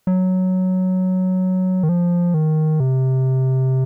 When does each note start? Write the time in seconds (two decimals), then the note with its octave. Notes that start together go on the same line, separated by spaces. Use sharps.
0.07 F#3
1.83 D#3
1.89 F3
2.34 D#3
2.80 C3